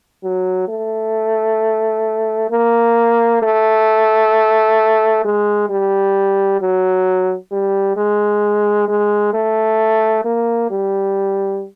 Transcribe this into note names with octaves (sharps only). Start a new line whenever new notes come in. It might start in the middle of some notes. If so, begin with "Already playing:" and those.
F#3
A3
A#3
A3
G#3
G3
F#3
G3
G#3
G#3
A3
A#3
G3